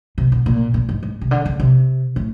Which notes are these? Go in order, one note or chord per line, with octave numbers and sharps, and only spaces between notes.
C3
B2
A#2
A#2
G#2
G#2
C3
D3
C#3
C3
A2